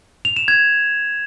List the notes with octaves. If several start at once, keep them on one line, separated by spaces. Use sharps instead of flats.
F7
E7
G#6